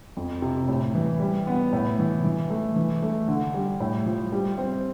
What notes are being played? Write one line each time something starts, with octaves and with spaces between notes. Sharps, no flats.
F2
C3
A2
E3
G3
B3
A2
E3
E3
A3
E3
A3
D3
G3
A2
F3
G3
C4